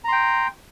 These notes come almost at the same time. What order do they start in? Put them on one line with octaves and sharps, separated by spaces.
A#5 C6 G5